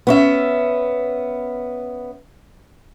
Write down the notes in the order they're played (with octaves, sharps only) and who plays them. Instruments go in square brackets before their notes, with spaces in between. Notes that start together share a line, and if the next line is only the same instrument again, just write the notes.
[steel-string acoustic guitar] B3 C#4 E5